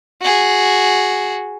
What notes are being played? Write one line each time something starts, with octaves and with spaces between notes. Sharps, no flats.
F#4 G#4